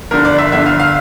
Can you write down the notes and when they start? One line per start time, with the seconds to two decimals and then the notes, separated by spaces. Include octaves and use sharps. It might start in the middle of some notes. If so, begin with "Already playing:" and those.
0.11 G1 G2 D3 A#4
0.25 D5
0.38 E5
0.52 G1 G2 D3 E5
0.66 F5
0.80 F5